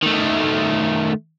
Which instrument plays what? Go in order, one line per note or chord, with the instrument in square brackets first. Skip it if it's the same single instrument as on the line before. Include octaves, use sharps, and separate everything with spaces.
[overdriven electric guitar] D#3 A3